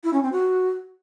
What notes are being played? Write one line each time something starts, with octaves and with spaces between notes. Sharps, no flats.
E4
C#4
C4
F#4